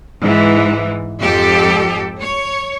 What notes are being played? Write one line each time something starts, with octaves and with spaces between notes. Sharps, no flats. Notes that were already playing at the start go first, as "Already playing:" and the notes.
G#2 E3 G#3
F2 G#2 G4 A4
C#5